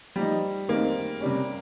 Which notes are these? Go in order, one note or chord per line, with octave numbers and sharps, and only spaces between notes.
F3 G3 A#3 D#4
D#3 G#3 A#3 C4
C3 G3 C#4